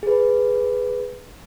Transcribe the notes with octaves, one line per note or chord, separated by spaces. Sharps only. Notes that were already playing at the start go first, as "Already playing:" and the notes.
G#4 B4